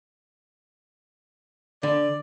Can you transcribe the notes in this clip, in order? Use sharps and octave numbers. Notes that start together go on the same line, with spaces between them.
D3 D5